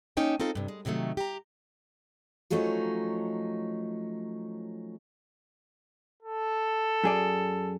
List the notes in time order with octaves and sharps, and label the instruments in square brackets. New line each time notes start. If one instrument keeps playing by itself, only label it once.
[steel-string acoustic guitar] A#3 C#4 D#4 C#5 G5 A5
C4 D#4 F4 A4
G2 C3
G#3
A2 C3 D#3 F#3 A3
G4 A#5
F3 F#3 A3 C#4 D#4
[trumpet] A4
[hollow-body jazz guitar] F#2 G#4 D5